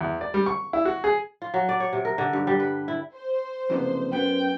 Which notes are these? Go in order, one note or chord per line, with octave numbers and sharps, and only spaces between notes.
E2
D5
G3
C#6
E4
F#4
G#4
F4
F#3
D5
C#5
C3
A#4
D3
G2
G3
B4
E4
C5
F#1 F2 C3 B3
F#2 B3 G5